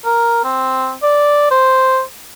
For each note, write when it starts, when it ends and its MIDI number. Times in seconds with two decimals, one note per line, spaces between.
0.05 0.41 70
0.44 0.92 60
1.03 1.47 74
1.51 2.01 72